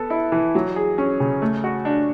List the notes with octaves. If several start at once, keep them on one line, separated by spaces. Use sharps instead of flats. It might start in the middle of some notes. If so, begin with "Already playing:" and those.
Already playing: B3 A4
E4
E3
F#3
G#4
C#4
C#3
A3
F#4
D4